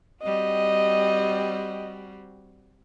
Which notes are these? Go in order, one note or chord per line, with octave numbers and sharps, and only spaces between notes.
G3 C4 F#4 D#5